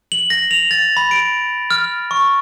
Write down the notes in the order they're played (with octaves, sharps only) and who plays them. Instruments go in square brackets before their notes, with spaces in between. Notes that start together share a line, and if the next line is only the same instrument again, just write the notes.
[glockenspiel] F#7
A#6
F7
A6
B5
D7
F6
C#6